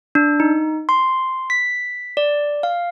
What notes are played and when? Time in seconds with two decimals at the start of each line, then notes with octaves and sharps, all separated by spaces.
0.15 D4
0.40 D#4
0.89 C6
1.50 B6
2.17 D5
2.63 F5